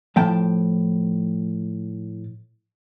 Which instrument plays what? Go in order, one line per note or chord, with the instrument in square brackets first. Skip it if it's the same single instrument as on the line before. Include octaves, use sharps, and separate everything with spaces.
[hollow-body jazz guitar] A2 F3 G5 A5